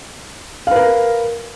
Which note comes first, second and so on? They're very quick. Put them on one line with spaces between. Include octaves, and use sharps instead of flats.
F5 B4 A#4